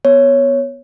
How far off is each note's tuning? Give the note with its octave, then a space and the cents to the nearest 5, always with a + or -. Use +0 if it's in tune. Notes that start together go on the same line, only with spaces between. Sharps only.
B3 +0 C#5 +0